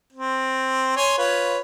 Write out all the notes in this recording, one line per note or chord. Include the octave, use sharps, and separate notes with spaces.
C4
C#5 G#5 C6
F4 B4 C#5